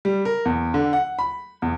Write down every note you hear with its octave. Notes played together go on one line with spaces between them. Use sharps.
G3
A#4
E2
D3
F#5
B5
E2